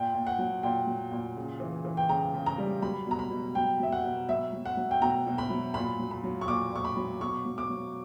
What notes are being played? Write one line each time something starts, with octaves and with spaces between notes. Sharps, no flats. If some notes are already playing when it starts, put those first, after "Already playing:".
Already playing: A#2 G5
A#2
F#5
F#3
A#2 G5
F#3
A#2
C#3
E3
E3
G5
C#3 A#5
C#3
A#5
G3
F#3 B5
B2 A#5
B5
B2
F#3 G5
F#3 E5
F#5
B2
F#3 E5
F#3
F#5
F#3
G5
B2 A#5
B2
B5
F#3
A#2 B5
F#3
B5
F#3
C#6
A#2 D6
A#2 C#6
B5
F#3
B2 C#6
F#3
D6
F#3